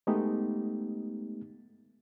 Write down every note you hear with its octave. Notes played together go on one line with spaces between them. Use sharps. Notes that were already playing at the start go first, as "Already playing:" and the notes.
G#3 A3 B3 D#4 G4